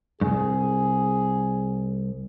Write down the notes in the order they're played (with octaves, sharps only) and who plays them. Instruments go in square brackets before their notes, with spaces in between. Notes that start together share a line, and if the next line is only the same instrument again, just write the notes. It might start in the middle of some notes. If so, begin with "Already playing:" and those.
[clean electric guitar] C2 G2 [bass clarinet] G#4